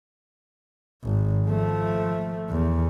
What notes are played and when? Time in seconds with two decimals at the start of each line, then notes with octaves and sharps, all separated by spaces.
1.03 G#1
1.47 F3 A3
2.50 E2